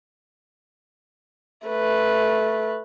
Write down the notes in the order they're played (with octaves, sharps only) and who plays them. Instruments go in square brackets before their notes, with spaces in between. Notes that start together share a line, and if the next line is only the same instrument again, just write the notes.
[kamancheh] A3 B4